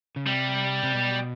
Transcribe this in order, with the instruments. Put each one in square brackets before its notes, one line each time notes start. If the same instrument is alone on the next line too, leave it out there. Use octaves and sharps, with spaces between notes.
[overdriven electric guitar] C#3
[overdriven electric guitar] C3 [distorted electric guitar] G3
[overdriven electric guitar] C3
B2